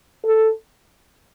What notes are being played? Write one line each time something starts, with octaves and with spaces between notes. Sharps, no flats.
A4